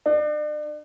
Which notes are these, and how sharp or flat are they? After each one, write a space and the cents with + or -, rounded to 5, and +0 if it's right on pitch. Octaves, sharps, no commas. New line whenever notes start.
D4 +40